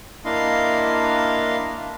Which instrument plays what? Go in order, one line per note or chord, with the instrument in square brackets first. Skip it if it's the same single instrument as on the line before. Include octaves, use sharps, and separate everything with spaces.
[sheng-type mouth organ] A#3 D4 E4 D#5 F5 C6